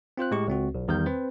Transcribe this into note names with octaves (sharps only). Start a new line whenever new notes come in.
C4 F4 C5 F#6
A2 G#3 G4 C#6
C#2 C4 F#4
B1
E2 D#3 G3 A#4 G6
C4 B4 C5